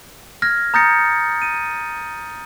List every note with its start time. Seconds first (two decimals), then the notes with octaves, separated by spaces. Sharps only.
0.42 F6 G#6 A#6
0.74 A#5 D#6 G6 A6 A#6 C#7
1.42 D#7